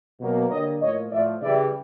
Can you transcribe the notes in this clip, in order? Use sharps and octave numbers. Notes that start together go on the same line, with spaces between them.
B2 F#3 A#3
D3 G3 A#3 C#5 D#5
A2 F3 A#3 C#5 D#5
A2 F3 A3 D5 E5
C#3 E3 G3 D5 E5